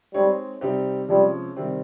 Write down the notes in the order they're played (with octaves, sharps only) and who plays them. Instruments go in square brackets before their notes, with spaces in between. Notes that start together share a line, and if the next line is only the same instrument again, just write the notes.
[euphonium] G3 [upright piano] G#3 C4 D#4 G#4 C#5
[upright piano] C3 G3 C4 D#4 G4
[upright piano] C3 F3 G#3 C#4 [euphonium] G3
[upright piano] C3 D#3 G3 C4 G4